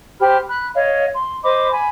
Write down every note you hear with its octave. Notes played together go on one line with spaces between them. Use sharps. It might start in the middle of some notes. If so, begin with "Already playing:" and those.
G4 C5 B5 F6
B5 F#6
C#5 D#5 F5
C6
C5 D#5 B5 D6
G#5 B5